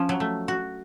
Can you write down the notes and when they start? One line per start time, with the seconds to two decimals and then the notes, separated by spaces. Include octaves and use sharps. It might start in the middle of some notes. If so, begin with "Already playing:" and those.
Already playing: F3 C#4
0.09 F#3
0.20 A3
0.48 F#4